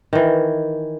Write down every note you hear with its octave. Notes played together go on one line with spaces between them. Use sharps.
D#3 E3